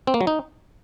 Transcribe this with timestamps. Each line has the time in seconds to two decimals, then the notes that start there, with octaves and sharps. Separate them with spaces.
0.07 C4
0.14 A#3
0.21 F#3
0.27 D#4